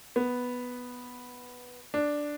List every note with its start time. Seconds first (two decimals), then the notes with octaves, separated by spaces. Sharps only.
0.16 B3
1.94 D4